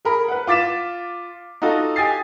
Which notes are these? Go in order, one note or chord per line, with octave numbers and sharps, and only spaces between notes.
G#4 A#4 B5
B4 F#5
F4 D6 A6 B6 E7
D#4 F4 F#4 A4
G4 G5 G#5 D#6 A6 C7